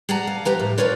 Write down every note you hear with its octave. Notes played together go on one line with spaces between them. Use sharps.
G#4 D5 F#5 A5 A#5
F5
F3 G4 B4 A#5
A2
F4 A#4 B4 C#5 D5